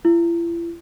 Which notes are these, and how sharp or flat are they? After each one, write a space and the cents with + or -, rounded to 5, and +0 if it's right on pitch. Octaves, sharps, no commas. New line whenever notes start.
E4 +45